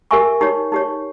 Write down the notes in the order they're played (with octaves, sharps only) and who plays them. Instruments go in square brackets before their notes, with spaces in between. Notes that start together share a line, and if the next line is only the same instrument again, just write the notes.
[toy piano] G4 A#4 E5 G#5 C#6
D#4 G4 C#5
D#4 G4 C#5